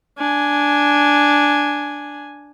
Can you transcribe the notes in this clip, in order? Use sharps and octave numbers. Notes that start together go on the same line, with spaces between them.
D4 G#5